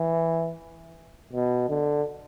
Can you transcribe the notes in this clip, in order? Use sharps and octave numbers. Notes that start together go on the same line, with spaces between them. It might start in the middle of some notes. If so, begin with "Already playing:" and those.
Already playing: E3
B2
D3